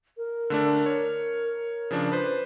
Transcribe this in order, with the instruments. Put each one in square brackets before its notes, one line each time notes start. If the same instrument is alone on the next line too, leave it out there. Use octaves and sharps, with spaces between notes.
[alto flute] A#4
[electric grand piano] D3 A3 D4
C#5
C#3 F3 D4
B4 C5